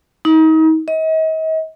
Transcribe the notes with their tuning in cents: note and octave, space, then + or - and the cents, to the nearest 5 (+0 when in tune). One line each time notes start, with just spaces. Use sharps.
D#4 +35
D#5 +40